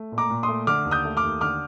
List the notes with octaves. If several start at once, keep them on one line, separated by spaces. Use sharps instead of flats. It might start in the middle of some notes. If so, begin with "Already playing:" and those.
Already playing: A3
A#2
A#5 D6
A#2
A3 C6 D#6
D3 D6 F6
D#2
D#6 G6
A3
D6 F6
D#2
D3 D6 F6